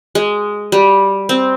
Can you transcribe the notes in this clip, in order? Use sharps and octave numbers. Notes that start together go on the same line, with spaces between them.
G#3
G3
C4